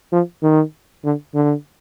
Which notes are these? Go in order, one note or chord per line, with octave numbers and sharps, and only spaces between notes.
F3
D#3
D3
D3